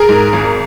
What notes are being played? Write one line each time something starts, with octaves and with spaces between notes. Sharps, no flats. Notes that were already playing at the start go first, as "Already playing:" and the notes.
Already playing: G#4 A#4
G#2
G#1